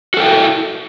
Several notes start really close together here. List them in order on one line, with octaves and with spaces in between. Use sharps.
F#4 A4 G5 E4